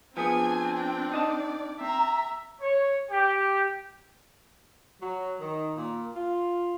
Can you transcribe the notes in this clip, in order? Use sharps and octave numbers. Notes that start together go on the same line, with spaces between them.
F3 B3 C4 D4 G#4 G#5
G5
D#4 D5 D#5 A5
C4 E5 A#5
C#5
G4
F#3
D#3
A#2
F4